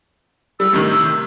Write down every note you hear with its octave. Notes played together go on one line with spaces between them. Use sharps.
G3 E6
A2 C3 D#3